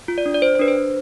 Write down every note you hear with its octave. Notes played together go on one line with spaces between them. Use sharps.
F4
D5
D4
D5
D4 C5
C5
D4 B4
C5
D4